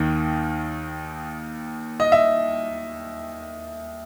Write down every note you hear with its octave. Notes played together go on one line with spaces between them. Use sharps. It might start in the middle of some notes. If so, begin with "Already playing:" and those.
Already playing: D#2 D#3
D#5
E5